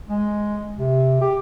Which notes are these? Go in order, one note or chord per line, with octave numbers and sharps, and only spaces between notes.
G#3
C3
G4